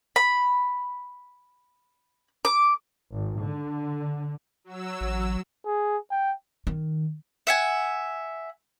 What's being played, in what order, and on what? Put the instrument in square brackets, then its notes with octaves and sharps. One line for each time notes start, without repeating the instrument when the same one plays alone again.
[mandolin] B5
D6
[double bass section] G#1
D3
[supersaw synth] F#3 E6
[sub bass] A1
[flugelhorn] G#4
G5
[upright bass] D#3
[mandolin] E5 F#5 G#5